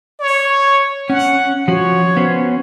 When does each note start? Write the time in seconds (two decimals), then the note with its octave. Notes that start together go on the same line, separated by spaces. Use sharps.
0.20 C#5
1.10 C#4 F#5
1.68 F3 F#4 C#5
2.17 B3 C#4 C5